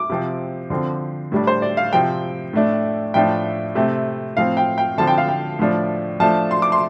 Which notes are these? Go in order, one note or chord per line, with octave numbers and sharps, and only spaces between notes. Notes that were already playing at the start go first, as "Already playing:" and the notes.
Already playing: D6
C3 F3 C4
D3 F3 C4
A2 G3 D4
C5
D5
F5
C3 F3 C4 G5
A2 A3 D4
A2 F3 A3 D4 G5
C3 A3 C4
A2 F3 C4 F5
G5
G5
D3 F3 C4 A5
G5
F5
G5
A2 F3 D4
F3 A3 D4 A5
C6
D6
C6